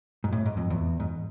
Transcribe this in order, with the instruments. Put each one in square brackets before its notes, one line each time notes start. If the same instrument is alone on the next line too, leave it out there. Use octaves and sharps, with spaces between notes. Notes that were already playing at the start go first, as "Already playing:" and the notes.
[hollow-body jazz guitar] G#2
A2
G#2
F2
E2
G#2